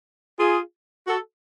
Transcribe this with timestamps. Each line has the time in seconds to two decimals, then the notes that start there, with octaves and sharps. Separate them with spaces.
0.38 F4 G#4
1.07 F#4 A4